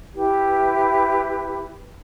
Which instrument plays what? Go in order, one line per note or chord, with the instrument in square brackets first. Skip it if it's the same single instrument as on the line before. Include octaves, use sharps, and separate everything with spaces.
[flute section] E4 G4 B4